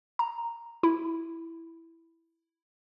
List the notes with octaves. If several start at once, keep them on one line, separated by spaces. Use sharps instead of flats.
A#5
E4